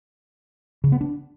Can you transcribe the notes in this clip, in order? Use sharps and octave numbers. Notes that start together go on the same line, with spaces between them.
C#3
B3
D4